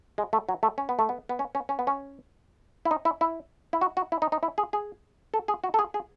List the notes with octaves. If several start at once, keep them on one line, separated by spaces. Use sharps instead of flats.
G#3
A3
F#3
A3
C#4
B3
A3
B3
B3
C#4
C#4
C#4
B3
C#4
E4
D#4
E4
E4
E4
F#4
F#4
E4
D#4
D#4
E4
G#4
G#4
A4
G#4
F#4
A4
G#4
G#4